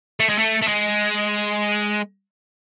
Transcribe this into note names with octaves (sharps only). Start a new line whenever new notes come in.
A3
G#3
A3
A3
G#3